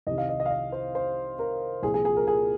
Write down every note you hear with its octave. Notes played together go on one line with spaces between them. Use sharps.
C2 C3 D#3 D#5
F5
D#5
D#5
F5
D#5
C5
C5
A#4
C2 A#2 F3 G#4
G#4
G#4
A#4
G#4